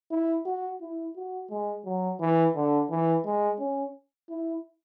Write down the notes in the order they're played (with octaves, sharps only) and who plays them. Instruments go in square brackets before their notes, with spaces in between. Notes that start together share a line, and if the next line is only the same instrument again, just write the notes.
[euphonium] E4
F#4
E4
F#4
G#3
F#3
E3
D3
E3
G#3
C#4
E4